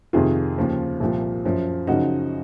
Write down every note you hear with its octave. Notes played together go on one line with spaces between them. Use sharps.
F2 C3 D#3 F4 G#4
D#2 C#3 F3
C2 A#2 F3
F#2 F3
F#2 C#3 F3 D#4 F#4